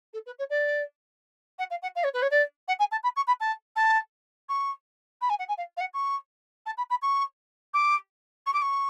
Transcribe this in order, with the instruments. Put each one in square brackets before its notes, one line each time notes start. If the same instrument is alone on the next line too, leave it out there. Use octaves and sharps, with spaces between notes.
[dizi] A4
B4
C#5
D5
F#5
F5
F#5
F5
C#5
B4
C#5
D5
F#5
G#5
A5
B5
C#6
B5
A5
A5
C#6
B5
G#5
F#5
G#5
F5
F5
F#5
C#6
A5
B5
B5
C#6
D6
C#6
D6
C#6